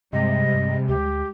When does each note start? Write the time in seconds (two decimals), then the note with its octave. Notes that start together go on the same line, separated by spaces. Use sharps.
0.13 G2 C3 G3 G#3 D#5
0.54 G2
0.88 D2 G4